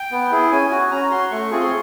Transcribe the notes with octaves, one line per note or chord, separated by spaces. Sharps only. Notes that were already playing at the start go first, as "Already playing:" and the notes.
Already playing: G5
B3
E4 G#4
C#4 G#5
F#4
C#4 A#5
F#4 C6
A3 C#6
C4 F4 G#4
C6